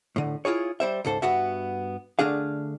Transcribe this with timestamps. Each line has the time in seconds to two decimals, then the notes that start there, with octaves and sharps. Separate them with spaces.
0.16 A2 D3
0.45 E4 F4 G#4 C#5
0.80 G3 C5 E5
1.05 C#2 G#2 A4 C5
1.22 G2 B3 F#4 E5
2.19 D3 A3 D4 G#4 F5